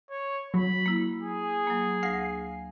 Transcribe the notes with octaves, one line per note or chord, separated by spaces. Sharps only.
C#5
F#3 B5
A#3 E4
G#4
F#3 A#3
D2 F5 A#6 C7